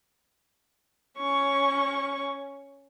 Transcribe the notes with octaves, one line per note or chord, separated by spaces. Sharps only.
C#4 C#6